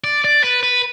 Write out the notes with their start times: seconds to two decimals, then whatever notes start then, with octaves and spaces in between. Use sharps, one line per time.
0.04 D5
0.24 D5
0.43 B4
0.63 B4